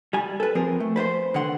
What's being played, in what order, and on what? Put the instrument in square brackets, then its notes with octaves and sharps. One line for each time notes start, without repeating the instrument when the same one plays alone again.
[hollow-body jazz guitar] G3 G#5
A4 B4
F3 C4 G#4 A#4
A3
B4 C5 F5 C6
D3 D#3 F#5 C6